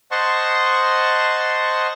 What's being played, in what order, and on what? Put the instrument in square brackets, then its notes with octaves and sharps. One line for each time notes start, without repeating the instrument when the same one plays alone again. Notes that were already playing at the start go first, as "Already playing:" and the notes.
[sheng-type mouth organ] C5 D#5 F#5 A5 C6 C#6